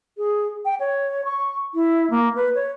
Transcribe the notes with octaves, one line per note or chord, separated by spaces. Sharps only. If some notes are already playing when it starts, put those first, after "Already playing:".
G#4
G5
C#5
C#6
E4
A#3
B4
C#5